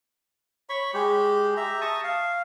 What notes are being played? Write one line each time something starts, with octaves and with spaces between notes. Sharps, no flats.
C#5 B5 C#6
G#3 G4
G4 E5 A#5
A5 C#6 D#6
F5